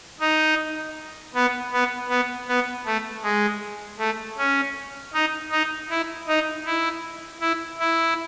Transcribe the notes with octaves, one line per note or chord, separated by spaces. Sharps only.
D#4
B3
B3
B3
B3
A3
G#3
A3
C#4
D#4
D#4
E4
D#4
E4
E4
E4